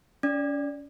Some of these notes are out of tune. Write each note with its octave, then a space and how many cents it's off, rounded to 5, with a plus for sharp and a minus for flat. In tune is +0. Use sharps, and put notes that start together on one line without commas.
C#4 +35 D5 +0